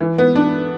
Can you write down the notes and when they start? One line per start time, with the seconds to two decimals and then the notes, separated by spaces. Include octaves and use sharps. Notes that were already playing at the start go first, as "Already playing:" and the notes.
0.01 E3
0.18 B3
0.35 D4